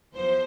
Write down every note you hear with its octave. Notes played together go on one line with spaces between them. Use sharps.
E2 F3 C5